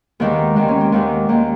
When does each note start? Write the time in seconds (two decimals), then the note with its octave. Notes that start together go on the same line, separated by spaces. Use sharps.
0.20 D#2 D#3 G#3 B3
0.56 D#2 D#3 G#3 C4
0.68 C#4
0.81 C4
0.92 D#2 D#3 G#3 B3
1.29 D#2 D#3 G#3 A#3